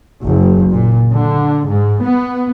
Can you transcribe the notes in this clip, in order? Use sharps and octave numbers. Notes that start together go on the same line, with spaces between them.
F#1
A#2
D3
G#2
B3